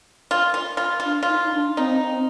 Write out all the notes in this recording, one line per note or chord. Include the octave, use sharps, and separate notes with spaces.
F4
F4
F4
F4
D4
F4
D#4
D#4
D4
C4 D#4
C4